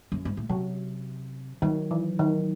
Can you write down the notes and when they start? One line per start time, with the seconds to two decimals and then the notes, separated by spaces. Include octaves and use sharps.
0.12 F#2
0.25 G#2
0.37 A2
0.49 C3 F#3
1.62 D#3 F#3
1.91 E3
2.19 D#3